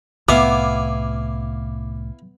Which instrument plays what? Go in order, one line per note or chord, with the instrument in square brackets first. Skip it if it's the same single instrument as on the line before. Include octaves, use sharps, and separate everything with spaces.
[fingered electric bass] C2 A2 [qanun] B3 [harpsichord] E4 F5 G#5 [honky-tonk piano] D6